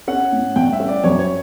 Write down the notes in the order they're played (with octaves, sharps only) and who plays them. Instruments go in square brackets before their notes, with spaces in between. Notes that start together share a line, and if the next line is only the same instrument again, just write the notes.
[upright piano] C#4 [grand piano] F#5
[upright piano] A2
[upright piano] G2 [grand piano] G5
[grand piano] E5
[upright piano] C#4
[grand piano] D5
[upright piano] F#2 [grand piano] C#5
[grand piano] C#5